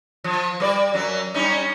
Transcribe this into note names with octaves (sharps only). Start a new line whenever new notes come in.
F3
G3 C#5 D5
F#2 F#3
G3 C#4 D#4